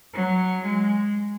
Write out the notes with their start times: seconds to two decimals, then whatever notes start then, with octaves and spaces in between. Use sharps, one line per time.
0.14 F#3
0.65 G#3